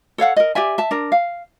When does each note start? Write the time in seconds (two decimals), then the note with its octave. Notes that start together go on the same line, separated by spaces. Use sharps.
0.18 A4 C#5 F5 F#5
0.36 A#4 D#5
0.55 G4 D5 E5 G#5
0.78 E5 A5
0.91 D4 A#4
1.12 F5